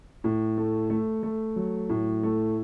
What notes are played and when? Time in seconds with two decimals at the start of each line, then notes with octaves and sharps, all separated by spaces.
0.24 A2
0.58 A3
0.90 A3
1.23 A3
1.56 F#3
1.89 A2
2.23 A3